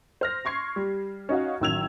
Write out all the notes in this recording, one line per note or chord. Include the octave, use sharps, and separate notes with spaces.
C5 F6 A#6
C6 C#6 G#6 C7
G3
C#4 D#4 F#4 F5
A1 D#3 F#3 E6 G#6 F7